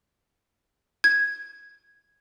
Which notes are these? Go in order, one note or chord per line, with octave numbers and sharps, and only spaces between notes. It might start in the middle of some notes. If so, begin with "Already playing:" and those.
G#6